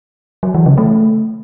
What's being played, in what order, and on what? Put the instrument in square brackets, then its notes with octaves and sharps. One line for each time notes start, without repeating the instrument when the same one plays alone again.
[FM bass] F#3
E3
C#3
A3